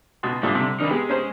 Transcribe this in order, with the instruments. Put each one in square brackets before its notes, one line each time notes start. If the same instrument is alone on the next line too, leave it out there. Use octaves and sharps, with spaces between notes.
[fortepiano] C#2 B2 [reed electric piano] C6
[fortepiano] G#2 A3 F4 [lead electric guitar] D3 [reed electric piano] G3
[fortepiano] C3
[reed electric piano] D#3 D4 F6 [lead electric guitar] D#4 B4
[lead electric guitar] G#3 [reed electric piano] B3 G4 G#4
[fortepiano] C#4 C5